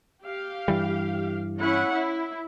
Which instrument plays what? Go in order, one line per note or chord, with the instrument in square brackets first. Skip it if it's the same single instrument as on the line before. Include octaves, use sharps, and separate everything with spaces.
[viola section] G4 F5
[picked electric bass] G2 E3 G3
[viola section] C#4 E4 F#5
E4